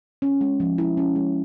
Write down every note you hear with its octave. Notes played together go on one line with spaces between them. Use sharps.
C#4
G#3
F3
E4
C#4
G#3